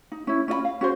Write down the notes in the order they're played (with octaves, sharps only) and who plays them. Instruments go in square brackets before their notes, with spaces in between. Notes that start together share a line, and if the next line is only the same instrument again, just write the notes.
[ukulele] D#4
C#4 E4
C#4 F4 D#5 B5
F5
C#4 F#4 G#4 C5